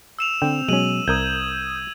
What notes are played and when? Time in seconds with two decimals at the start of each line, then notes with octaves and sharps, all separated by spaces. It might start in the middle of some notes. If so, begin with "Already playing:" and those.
0.19 E6 E7 F7
0.42 D3 C4 G5
0.68 B2 F#3 G#3 C#4 D#7 F#7
1.08 C2 A#4 D#6 G6 G#6